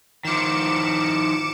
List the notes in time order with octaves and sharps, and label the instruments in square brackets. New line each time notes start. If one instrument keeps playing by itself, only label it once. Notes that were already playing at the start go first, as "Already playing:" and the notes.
[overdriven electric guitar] D#3 F3 [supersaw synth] D6 C#7 E7